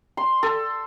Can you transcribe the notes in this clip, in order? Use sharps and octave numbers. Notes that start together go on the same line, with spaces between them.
C6
A4